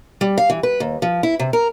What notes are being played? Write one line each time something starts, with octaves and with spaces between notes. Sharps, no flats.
G3
F5
E3
B4
D#2
F3
E4
C3
A#4